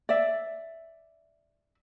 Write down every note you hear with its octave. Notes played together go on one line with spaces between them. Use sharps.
D5 E5